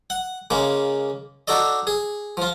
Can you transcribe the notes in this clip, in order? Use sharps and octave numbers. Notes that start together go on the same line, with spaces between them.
F#5
C#3 G#3 A#3
D4 D#4 F#4 A4 D5 D#5
G#4
F3 F4